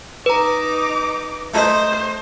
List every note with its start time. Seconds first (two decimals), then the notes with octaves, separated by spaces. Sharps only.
0.26 D#4 B4 A#5 D6
1.54 A3 D#4 C5 D#5